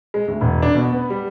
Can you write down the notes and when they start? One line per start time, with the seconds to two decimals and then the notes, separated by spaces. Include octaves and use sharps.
0.14 G#3
0.28 D2
0.41 E1
0.62 D4
0.75 B2
0.93 B3
1.10 G3